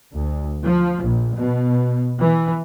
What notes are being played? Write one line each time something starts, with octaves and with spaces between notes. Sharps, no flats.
D2
F3
A#1
B2
E3